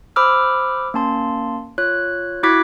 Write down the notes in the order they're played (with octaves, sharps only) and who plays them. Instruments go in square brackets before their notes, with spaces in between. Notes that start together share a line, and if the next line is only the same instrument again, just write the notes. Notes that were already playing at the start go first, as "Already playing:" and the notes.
[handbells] C5 B5 D6 E6 F6
A#3 C#4 A5 C6
F4 C#5 F#6
E4 F#4 D6 F#6 G#6 B6